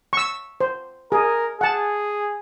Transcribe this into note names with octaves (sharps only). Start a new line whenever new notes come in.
C#6 E6
C5
G#4 A#4
G#4 F#5 A5